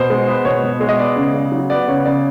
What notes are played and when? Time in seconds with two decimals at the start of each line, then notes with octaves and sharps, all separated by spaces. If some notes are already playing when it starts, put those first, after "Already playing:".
Already playing: B2 C5
0.10 G#3
0.28 B3
0.45 B2 C#5
0.64 B2
0.80 G#3
0.89 D#5
0.98 B3 D5
1.16 C#3
1.34 C#3
1.52 F#3
1.70 B3 D5
1.88 C#3 C#5
2.05 C#3 D5